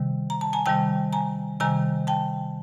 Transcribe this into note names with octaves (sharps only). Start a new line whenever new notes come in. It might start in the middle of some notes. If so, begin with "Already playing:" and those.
Already playing: C3 D#3 G3
A#5
A5
G#5 A#5
C3 D#3 G3 G5 A5
G#5 A#5
C3 D#3 G3 G#5 A#5
G5 A5